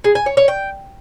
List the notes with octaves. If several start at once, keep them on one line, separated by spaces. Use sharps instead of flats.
G#4
G#5
C#5
C#5
G5